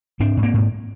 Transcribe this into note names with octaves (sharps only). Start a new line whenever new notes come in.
G#2 C4 D4
G#2
A#3 C4
G#2